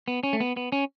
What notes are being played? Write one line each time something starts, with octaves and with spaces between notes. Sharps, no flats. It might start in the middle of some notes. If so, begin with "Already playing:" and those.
B3
C#4
A3
B3
B3
C#4